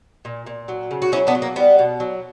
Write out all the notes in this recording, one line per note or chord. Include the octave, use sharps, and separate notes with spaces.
A#2
A#2
F#3
C#3
F#4
F#3 C#4 E4
B3 D4
F#3
A#3
G3 B3
B2
F#3